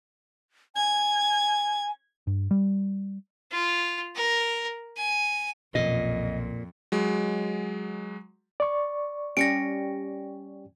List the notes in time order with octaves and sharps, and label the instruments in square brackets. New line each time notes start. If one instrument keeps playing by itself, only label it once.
[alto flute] G#5 [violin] G#6
[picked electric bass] G2
G3
[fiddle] F4
A#4
G#5
[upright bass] B1 C#4 [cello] F2 [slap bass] A#2 [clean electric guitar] D#5
[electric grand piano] F#3 G#3
[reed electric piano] D5 C#6
[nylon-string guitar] G3 C#4 G4 [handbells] A#6 C#7 D7